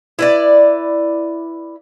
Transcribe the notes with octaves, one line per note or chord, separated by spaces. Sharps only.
E4 B4 D5